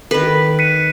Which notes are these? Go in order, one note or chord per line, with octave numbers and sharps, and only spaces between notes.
D#3 A4 B4
F#6 B6 C#7 D#7